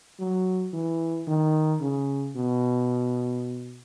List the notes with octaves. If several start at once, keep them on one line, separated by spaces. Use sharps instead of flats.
F#3
E3
D#3
C#3
B2